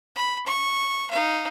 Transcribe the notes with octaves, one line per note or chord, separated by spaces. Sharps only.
B5
C#6
D#4 F5